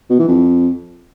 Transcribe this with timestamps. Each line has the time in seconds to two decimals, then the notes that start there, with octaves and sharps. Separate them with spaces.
0.10 B2
0.19 E3
0.28 F2